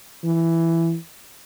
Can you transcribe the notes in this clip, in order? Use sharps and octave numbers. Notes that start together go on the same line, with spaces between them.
E3